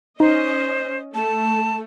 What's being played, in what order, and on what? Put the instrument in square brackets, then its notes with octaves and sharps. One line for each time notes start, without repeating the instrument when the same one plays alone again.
[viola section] C#4 D#5 [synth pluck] D#4 [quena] C5
[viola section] A3 [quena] A5